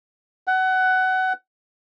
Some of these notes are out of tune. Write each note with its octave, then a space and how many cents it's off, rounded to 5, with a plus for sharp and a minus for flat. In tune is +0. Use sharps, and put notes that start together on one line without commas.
F#5 +20